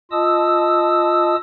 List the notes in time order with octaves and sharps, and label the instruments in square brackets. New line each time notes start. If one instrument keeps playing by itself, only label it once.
[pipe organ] F4 D#5 A5 D#6 E6